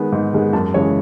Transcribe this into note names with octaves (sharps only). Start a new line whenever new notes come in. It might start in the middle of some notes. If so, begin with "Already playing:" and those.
Already playing: D#3 G#3 B3
G#2
D#3 G#3 B3
F#2 A5
C#3 E3 G#3 C#5